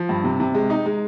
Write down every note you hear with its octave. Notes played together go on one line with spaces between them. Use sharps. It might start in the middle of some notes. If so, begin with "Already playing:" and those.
Already playing: F3
G2
C3
C3
G#3
D#4
G#3